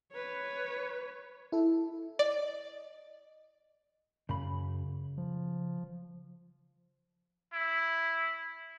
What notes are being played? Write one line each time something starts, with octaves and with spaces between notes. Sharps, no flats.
B4 C#5
E4 A4
D5 D#5
F#2 C#3 B5
F3
E4